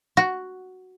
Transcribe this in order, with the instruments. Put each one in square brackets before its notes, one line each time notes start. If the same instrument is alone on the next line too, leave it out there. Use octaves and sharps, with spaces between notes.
[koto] F#4